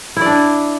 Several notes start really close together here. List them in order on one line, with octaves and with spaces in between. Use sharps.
E4 D5 D4